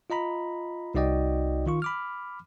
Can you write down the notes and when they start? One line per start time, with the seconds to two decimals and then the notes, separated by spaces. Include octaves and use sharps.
0.10 F4 D#5 A#5 B5
0.94 C2 D#4 F#4 D5 D#5 G5
1.66 D#3 F4 C#6
1.82 B5 D6 F6